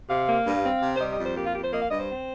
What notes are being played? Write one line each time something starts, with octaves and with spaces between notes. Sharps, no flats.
C3 F5
A#3
G2
C4
C3
C5
G3 D#5
D#5
F2
C5
A#3 G4
F4
F2 G4
C5
A#3 D#5
F5
G2 D#5
C5
C4